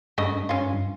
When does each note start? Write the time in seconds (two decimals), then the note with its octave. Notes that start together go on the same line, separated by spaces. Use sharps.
0.18 G2 C#3 A3 D#5
0.49 C#4 F4